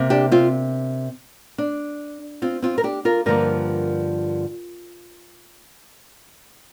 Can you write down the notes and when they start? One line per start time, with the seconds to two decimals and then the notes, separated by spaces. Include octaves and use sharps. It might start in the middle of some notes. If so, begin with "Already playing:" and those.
Already playing: C3 A#3
0.10 D4 G4
0.31 C4 F4
1.58 D4
2.42 C4 F4
2.62 C4 F4
2.78 A#4
2.84 D4 G4
3.05 F4 A#4
3.26 G2 D3 F3 A#3 F4 A#4